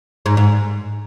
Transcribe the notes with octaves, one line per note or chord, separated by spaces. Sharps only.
G#2
G#2